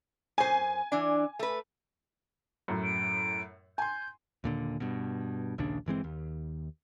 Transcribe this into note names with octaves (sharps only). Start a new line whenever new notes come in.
F#2 C5 G#5
E3 D4
A3 B4
F#2 A2
D7
G#5 C6 G6
D#2 A#2 D3
G2 B2
A#1 D#2 C#3 D4
G1 E3 G#3 C4
D#2